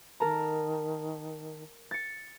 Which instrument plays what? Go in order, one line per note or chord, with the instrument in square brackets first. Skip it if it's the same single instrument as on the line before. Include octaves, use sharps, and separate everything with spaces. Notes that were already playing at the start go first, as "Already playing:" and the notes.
[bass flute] D#3 [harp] A#4 A5 A#5
[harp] A6 C#7